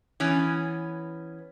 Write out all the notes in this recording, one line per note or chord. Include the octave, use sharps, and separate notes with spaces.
E3 B3 C#4